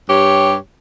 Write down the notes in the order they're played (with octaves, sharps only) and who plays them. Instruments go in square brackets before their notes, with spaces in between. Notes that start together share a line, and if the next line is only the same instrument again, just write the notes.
[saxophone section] G2 G4 C#5